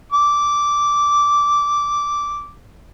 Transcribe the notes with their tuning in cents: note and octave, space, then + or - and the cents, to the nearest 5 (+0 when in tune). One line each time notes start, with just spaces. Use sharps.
D6 -10